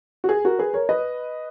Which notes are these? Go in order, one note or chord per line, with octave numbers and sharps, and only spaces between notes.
F#4
G#4
F#4 A#4
G#4 B4
A#4 C#5
B4 D#5